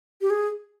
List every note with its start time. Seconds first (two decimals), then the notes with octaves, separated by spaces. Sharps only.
0.21 G4
0.30 G#4